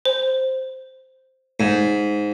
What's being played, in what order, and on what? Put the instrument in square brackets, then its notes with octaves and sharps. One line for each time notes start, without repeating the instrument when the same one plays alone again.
[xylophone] C5
[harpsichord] G#2